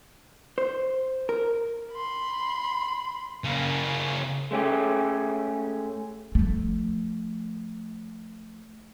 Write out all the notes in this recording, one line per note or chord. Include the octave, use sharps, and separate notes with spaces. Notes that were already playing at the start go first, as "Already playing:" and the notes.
C5
A#4
B5 C6
C#3 A#3
G#3 A3 C#4 G4
F3 A3